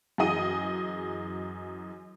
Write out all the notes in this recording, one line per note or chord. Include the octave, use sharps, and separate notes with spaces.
F#2 E3 G#4 D#5 D#7